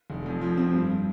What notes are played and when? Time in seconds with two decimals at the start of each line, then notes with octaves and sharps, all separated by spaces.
0.10 F1
0.26 F2
0.41 F3
0.57 C4
0.73 G2